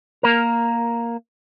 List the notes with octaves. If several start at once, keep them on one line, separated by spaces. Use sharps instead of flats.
A#3 A#4